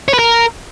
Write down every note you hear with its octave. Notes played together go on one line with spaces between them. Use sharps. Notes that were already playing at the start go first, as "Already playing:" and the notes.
C#5
B4
A#4